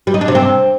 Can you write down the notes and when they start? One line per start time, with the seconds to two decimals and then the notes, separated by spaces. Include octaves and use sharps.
0.07 G3
0.14 D#4
0.21 D4
0.28 C3
0.35 C4